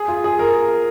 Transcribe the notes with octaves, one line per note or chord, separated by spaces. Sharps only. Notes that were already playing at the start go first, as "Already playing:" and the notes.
Already playing: G#4
F4
G#4
A#4